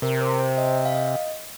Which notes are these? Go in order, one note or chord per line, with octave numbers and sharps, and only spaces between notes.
C3 A#4
C5
C5
D#5
D#5
F5
D#5